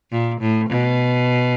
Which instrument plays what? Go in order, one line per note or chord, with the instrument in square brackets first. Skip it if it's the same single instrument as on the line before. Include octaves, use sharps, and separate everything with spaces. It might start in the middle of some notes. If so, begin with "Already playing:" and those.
[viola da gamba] A#2
A2
B2